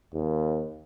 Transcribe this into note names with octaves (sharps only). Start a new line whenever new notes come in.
D#2